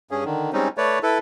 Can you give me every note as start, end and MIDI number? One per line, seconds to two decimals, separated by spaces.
0.11 0.24 43
0.11 0.24 61
0.11 0.24 68
0.25 0.51 50
0.25 0.51 51
0.53 0.68 55
0.53 0.68 56
0.53 0.68 60
0.53 0.68 61
0.53 0.68 63
0.77 0.99 57
0.77 0.99 71
0.77 0.99 73
0.77 0.99 74
1.03 1.18 64
1.03 1.18 69
1.03 1.18 71